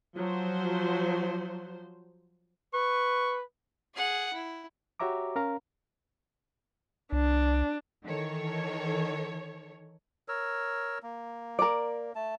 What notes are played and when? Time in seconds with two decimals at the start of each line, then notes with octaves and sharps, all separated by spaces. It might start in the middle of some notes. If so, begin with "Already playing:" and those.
0.16 F3 F#3 C5
2.73 B4 C#6
3.94 G#4 F#5
4.33 E4
5.00 F#4 G4 C#5 E5 A#5 D6
5.36 C#4 A#4 F5 A#5
7.12 C2 D4
8.04 D#3 E3 A4 C#5
10.28 A#4 C#5 E6
11.03 A#3
11.59 A#4 D5
12.15 A3 A5